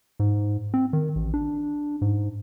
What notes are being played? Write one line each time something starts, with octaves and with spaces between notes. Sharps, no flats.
G#2
C4
D#3
A1
D4
G#2